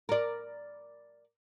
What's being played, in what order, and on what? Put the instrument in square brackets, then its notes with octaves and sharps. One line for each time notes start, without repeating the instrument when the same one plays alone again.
[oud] A#4 D5